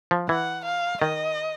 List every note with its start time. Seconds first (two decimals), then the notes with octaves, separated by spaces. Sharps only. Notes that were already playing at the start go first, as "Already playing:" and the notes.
0.11 F3
0.29 E3 F#5
0.65 F5
1.02 D#3 D#5